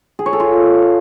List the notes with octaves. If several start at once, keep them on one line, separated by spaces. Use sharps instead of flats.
G#4
C#5
A4
F4